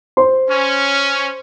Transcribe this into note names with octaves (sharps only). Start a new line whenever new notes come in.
C5 C6
C#4